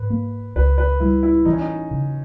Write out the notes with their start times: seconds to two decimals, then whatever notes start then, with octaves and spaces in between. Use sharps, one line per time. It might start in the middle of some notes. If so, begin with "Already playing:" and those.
Already playing: G#2 B4
0.10 A#3
0.56 C#2 B4
0.78 B4
1.00 G3 E4
1.23 E4
1.45 E3 D#4
1.53 C#4
1.61 D#4
1.91 C#3